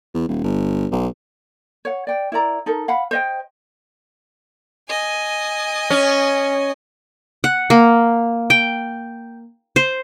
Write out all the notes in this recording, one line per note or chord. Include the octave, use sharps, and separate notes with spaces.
E2
D#1
G1
B1
C#5 F#5
D5 G5
E4 A#4 D5 A#5
D#4 A4 A#4
F5 F#5 B5
C5 D#5 G5
D#5 G#5
C#4
F#5
A#3
G5
C5